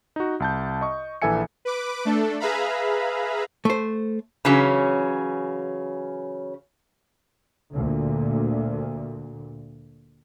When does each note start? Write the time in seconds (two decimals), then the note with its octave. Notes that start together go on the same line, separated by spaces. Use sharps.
0.16 D#4 F#4
0.40 C2 A5 G6
0.81 D#5 C#6
1.22 A#1 E3 A4 E5 G#5 C#7
1.65 B4 D6
2.05 A3 D4 A4
2.40 G#4 B4 E5 F5 A#5 B5
3.65 A3 C5
4.45 C#3 E3 F#3 C#4
7.75 D2 A#2